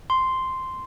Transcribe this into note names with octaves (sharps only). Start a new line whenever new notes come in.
C6